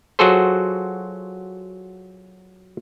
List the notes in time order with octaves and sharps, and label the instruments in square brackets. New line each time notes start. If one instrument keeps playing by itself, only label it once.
[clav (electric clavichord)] F#3 F4 F#4 G#4 A4 C5